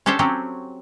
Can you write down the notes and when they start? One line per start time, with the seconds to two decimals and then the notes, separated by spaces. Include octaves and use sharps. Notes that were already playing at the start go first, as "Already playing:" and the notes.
0.06 C#4 D4 G4 A4 C5 C#5
0.19 F#3 C4 C#4 G4